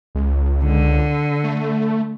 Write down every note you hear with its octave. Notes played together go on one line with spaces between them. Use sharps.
C#2
D3
A3